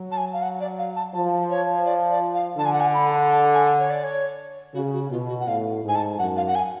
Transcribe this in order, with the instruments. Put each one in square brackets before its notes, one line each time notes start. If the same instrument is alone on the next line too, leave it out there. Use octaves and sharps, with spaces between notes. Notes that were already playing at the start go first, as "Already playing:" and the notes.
Already playing: [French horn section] F#3
[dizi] A5
G#5
F5
F#5
D5
F5
A5
[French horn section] F3 [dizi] A5
[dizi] C#5
D5
D5
F5
[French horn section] D3 [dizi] A5
[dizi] G#5
F#5
G#5
B5
A5
G#5
C#5
D5
C#5
[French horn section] C#3 [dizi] F#4
[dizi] F#4
[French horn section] B2 [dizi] F4
[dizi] F#4
F#5
[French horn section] A2 [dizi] F5
[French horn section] G#2 [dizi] G#5
[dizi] A5
[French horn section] F#2 [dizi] F#5
[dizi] F5
F#5
G#5